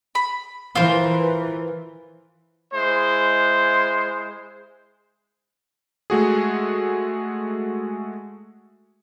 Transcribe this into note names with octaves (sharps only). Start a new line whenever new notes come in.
B5
E3 F4 A#4 C5
G#3 E4 C5
G#3 A3 F#4 G#4